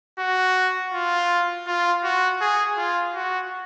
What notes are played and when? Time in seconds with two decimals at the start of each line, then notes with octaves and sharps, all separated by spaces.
0.19 F#4
0.93 F4
1.67 F4
2.04 F#4
2.41 G#4
2.77 F4
3.14 F#4